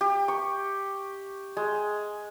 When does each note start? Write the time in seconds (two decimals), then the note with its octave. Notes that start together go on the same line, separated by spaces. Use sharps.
0.01 G4
0.28 C#6
1.57 G#3